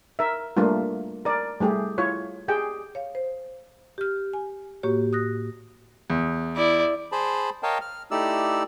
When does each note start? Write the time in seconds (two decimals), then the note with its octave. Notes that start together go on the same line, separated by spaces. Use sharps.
0.19 A#4 E5
0.57 G3 A3 A#3 D4 F4
1.25 A#4 D5
1.60 G3 A3 G4 G#4
1.98 E4 F4 C#5
2.48 G4 G#4 G5
2.95 C#5 F5
3.15 C5
3.98 G4 F6
4.34 G#5
4.83 A2 A#3 F#4 G4 C#5
5.13 D#6 F#6 A#6
6.10 E2
6.57 E4 D5
7.12 G#4 C5 A5 B5
7.63 A#4 C#5 D#5 F5 G5 A5
7.81 F6
8.11 A3 D#4 E4 G4 D5 E6